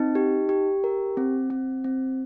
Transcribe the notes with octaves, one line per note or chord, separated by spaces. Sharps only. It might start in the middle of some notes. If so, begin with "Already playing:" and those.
Already playing: C4 D#4
G4
G4
A#4
C4
C4
C4